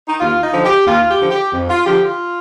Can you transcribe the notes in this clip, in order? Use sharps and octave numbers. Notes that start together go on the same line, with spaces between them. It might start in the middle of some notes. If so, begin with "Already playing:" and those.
D#4
D#2 F4
D#4
D3 F3
G4
D#2 F4
G4
D3 F3
G4
F2
F4
D3 F3 G4
F4